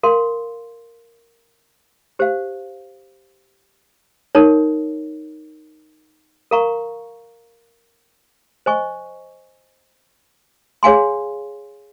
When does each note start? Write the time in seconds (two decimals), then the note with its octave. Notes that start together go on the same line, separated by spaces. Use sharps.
0.03 A#4 F5 C6
2.19 G4 C5 F5
4.35 D#4 A#4 C#5
6.51 A#4 F5 A#5 C#6
8.66 C5 D#5 G#5 C#6
10.83 G#4 C#5 F5 G#5 C6